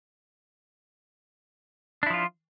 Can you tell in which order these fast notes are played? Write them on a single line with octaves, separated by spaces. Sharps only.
D4 E4 F3 F4